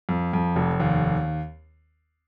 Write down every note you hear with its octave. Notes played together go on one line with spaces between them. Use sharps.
F2
F2
F1
D#2